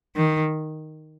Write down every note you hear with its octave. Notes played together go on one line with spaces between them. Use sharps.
D#3